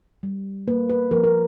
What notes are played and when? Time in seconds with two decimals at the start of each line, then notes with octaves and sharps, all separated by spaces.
0.23 G3
0.67 A#3 B4
0.90 B4
1.11 F3 A#4
1.24 A#4